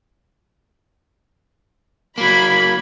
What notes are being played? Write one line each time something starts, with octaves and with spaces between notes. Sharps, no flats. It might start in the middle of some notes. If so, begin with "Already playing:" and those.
F#3 A#3 B5 G#6